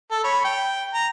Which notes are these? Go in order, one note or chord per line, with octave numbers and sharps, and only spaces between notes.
A4
C#5 B5
G5
A#5